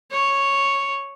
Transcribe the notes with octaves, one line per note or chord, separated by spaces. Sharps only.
C#5